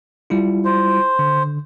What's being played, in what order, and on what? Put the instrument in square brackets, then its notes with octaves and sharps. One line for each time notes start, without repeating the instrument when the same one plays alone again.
[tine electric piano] G3 E4 F4
[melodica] C5
[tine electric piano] D3